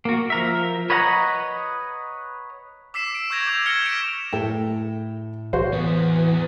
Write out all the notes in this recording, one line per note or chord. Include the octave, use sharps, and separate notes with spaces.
A#3 F#4
F3 A#4 E5
B4 C#5 D#5 F#5 A#5
D6 E6 B6 C7 E7
D7
C#6 E6 G6 G#6 A#6 F7
D6 G6 G#6 E7 F7
F6 G#6 A#6 C#7 G7
B6 D7 E7 F7 G7
A2 A4 G5
E3 F#4 C5
E2 B3